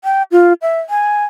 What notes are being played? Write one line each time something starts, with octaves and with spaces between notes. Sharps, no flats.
G5
F4
E5
G#5